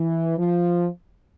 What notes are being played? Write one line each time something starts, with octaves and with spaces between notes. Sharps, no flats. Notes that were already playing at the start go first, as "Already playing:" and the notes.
Already playing: E3
F3